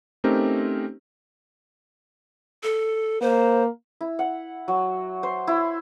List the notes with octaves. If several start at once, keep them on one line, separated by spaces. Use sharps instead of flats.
A3 C4 C#4 D#4 G4 A#4
A4
A#3 C5
E4
F#5
F#3
C5
E4